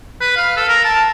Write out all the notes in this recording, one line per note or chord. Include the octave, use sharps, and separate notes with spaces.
B4
F5
A4
A#4
A5